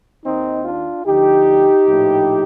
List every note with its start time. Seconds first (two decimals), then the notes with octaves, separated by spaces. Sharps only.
0.24 D#2 D#3 C4 D#4
0.65 D4 F4
1.06 D2 D3 F3 D#4 G4
1.86 A#1 A2 F3